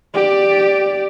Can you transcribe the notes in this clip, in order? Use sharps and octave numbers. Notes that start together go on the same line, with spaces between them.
G4 D5